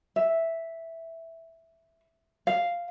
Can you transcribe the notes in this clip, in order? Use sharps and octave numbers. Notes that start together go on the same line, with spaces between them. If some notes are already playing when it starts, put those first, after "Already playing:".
E5
F5